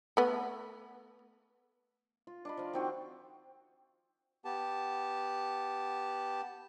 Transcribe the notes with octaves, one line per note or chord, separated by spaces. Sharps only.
A3 B3
F4
D4 D#5 B5
F3 F5
D#3 C4 F#4
B3 G4 A5